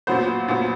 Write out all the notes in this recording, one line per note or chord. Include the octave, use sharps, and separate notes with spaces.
A#2 F#3 B3 C5
A#2 F#3 B3